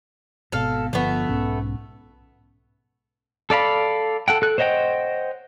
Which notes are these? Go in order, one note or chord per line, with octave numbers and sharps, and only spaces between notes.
G#1 B2 A4 F5
G1 D3 F3 A3 B3
B1 G#2 C#4
A4 D5 F5 B5
A4 F#5 G5
A4 F#6
C5 C#5 D#5 F#5 G5